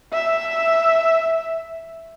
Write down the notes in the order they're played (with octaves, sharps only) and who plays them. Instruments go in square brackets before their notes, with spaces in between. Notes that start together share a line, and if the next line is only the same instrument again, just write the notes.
[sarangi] E5